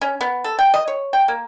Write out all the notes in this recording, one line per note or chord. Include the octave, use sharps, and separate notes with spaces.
C#4
B3
A4
G5
D#5
C#5
G5
A#3